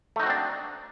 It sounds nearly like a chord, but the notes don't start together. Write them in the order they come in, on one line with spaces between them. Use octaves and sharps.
A3 D#4 F#4 C4 D4